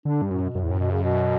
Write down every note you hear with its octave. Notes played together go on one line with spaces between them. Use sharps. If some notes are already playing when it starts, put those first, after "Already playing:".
D3 D4
G2
F#2 A2
B2
F#2
E2 A2
F#2
B2
C#3
B2